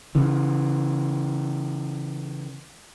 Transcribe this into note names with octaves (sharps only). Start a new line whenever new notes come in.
C#3 E3